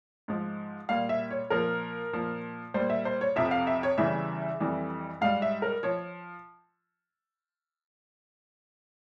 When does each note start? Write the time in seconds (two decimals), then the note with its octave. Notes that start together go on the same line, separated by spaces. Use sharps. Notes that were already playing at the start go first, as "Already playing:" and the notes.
0.28 G#2 F3
0.89 A#2 G3 F5
1.09 E5
1.31 C#5
1.50 A#2 F3 A#4
2.13 A#2 F3
2.74 A#2 G3 C5
2.90 E5
3.05 C5
3.21 C#5
3.36 F2 C3 F3 E5
3.51 F5
3.67 E5
3.83 C#5
3.98 E2 C#3 E3 G3 E5
4.60 F2 E3 G3
5.21 G#2 G3 F5
5.42 E5
5.62 A#4
5.83 F3 C#5